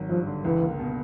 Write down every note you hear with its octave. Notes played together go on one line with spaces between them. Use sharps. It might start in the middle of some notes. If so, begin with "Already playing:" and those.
Already playing: G#1 F#3
G2 F3
D3
C#2 E3
A#3
B2